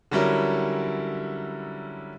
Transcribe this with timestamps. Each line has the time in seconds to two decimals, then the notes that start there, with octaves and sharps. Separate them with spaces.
0.11 D3 F#3 G3 C#4 E4 A#4